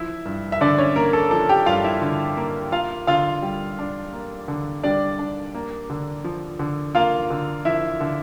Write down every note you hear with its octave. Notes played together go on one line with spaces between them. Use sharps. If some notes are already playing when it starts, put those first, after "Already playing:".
Already playing: F3 E4 E5
G2
E5
D3 D4 D5
C#4 C#5
A#3 A#4
A4
F3 A4
G4 G5
G2 F4 F5
E4 E5
D3
A#3
A#3 F4 F5
D3 F4 F5
G3
D4
A#3
D3
G3 D4 D5
D4
A#3
D3
F3
D3
A#3 F4 F5
D3
F3 E4 E5
D3